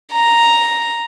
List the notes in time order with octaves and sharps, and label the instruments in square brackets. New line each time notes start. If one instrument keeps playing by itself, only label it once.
[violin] A#5